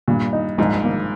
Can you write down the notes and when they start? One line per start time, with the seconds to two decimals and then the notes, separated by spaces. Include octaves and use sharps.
0.08 G2 A#2
0.33 D#4
0.58 A#1 G#2
0.84 A#3